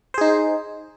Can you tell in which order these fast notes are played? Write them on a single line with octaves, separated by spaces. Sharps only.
C5 G#4 D#4